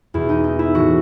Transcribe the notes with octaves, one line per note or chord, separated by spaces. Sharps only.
E2 B2 E4
D#4
D#4
E4
A2 E3 F#4